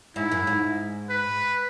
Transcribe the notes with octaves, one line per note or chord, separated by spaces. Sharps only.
G#2 E4
F#2
G#2
B4